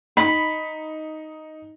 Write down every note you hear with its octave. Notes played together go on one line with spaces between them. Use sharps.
D#4 B5